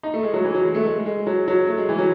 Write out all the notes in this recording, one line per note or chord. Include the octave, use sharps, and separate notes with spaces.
D#4
A3
G#3
F#3
E3
F#3
G#3
A3
G#3
G#3
F#3
F#3
A3
G#3
E3
F#3